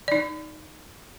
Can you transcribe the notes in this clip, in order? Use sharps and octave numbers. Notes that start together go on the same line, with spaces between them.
D#4 D5